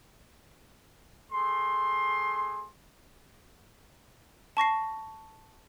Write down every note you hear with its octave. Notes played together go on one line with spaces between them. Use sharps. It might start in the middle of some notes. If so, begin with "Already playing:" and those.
A3 G#4 C6
A5 C#6 A#6 C7